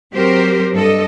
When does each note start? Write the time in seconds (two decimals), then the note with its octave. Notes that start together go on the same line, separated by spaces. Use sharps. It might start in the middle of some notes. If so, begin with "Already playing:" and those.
0.14 F#3 C4 G4 A#4 C5
0.74 G2 A4 D#5